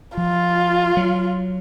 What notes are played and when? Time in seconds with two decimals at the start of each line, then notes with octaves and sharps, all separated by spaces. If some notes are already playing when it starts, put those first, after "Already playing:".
0.17 F3 F4
0.97 F#3